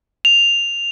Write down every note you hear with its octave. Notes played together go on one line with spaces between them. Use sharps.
F7